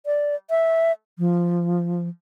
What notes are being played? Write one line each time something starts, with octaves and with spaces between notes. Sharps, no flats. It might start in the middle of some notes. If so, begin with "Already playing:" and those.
D5
E5
F3